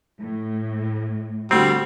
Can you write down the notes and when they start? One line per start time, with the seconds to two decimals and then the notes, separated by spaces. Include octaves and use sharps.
0.20 A2
1.51 D3 G3 A3 C4 F#4